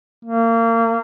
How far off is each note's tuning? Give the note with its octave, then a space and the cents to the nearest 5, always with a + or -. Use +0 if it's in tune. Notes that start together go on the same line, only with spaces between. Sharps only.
A#3 -30